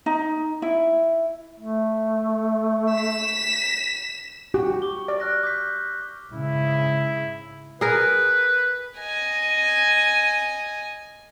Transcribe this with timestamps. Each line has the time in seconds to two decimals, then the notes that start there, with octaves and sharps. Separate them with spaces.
0.06 D#4
0.62 E4
1.60 A3
2.91 B6 E7
4.54 F#4 G4
4.82 C#6 D6 G7
5.08 D5
5.20 F6 F#6 A#6
5.43 D6 G6 B6
6.32 G#2 C#3 E4
7.81 G#4 A#4 B4
9.00 D#5 G#5